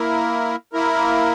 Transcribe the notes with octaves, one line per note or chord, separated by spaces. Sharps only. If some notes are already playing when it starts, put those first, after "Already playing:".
Already playing: A#3 E4 A#4
A#3 E4 A#4